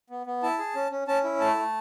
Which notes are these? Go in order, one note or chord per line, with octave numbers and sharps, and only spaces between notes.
B3
B3
E4 A5
G#4
C#4
C#4
C#4 A5
E4
A3 A5
A3